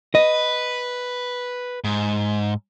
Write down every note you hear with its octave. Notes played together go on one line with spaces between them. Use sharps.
B4 D#5
G#2